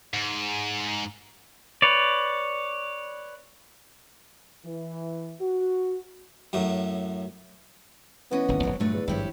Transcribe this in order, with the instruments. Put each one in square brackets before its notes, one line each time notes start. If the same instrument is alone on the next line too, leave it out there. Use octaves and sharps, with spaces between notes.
[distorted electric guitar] G#2
[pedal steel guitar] B4 C#5 D5
[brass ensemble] E3
F#4
[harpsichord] F#2 A2 F#3
[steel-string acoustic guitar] E3 C#4 D#5 [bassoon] B3
[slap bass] D1 G1 D#2
[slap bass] D#1 G#1 F2 [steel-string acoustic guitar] F#3
[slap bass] G2 A#2 F#3 [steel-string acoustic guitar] D3 A3 B4
[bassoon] E2
[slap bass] G#1 G2 F3 [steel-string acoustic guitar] E4 G4 C#5